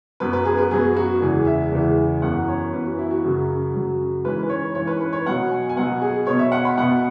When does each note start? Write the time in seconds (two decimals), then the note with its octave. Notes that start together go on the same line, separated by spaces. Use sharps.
0.20 F#2 F#3 B3 B4
0.33 B4
0.45 G#4
0.58 B4
0.71 F#2 F#3 B3 G#4
0.97 F#4
1.21 E2 C#3 E3 G#3 G#4
1.47 E5
1.72 E2 C#3 E3 G#3
2.22 F#2 E3 B3 F#5
2.48 C#5
2.73 F#2 E3 B3 B4
2.85 F#4
2.99 E4
3.11 F#4
3.24 F#2 C#3 F#3
3.74 F#2 C#3 F#3
4.24 G#2 E3 C#4 B4
4.43 B4
4.49 C#5
4.75 G#2 E3 C#4 C#5
4.87 B4
5.00 B4
5.13 C#5
5.26 B2 F#3 B3 F#5
5.51 G#5
5.69 G#5
5.76 B2 F#3 B3 F#5
6.02 G#4
6.27 B2 B3 C#5
6.39 E5
6.52 F#5
6.65 B5
6.78 B2 B3 F#5